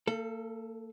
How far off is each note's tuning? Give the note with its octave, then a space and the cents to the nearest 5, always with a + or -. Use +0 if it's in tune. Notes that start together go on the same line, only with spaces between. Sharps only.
A#3 -40 A4 +0